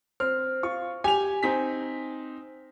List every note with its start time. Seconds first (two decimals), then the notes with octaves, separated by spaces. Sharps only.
0.20 C4 F6
0.63 F4 C#6
1.04 G4 G#5 F7
1.43 C4 D#4 B6